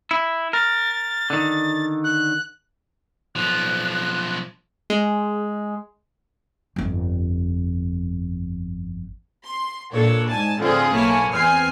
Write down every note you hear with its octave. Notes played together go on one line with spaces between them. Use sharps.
E4
A#4 A6
D3 D#3
F#6
B1 F3 F#6
G#3
G1 F2
C6
A#2 D4 A4 C#5
G#2 G#5 A5
A2 D3 F3 C4 F4 G#4
B1 A#3 E4 C#5 G#5 A5
E2 C4 G#5 F6 C7